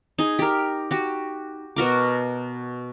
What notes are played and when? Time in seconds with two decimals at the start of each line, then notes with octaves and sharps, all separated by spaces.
0.19 D#4 G#4
0.39 G4 A#4
0.91 F#4 G4
1.76 B2 F#4 A#4 D6